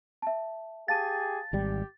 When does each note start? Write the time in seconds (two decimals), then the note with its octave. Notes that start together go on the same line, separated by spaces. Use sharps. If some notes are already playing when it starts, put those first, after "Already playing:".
0.22 E5 A5
0.88 G4 G#4 F5 A5 A6 D#7
1.53 G#1 G3 G4